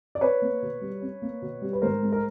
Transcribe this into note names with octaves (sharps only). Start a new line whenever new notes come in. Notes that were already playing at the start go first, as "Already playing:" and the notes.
D5
C#4 B4 C#5
A#3
B2
G3
C#4
A#3
B2
G3
B4
G#2 A#4 C5
G#3
A#4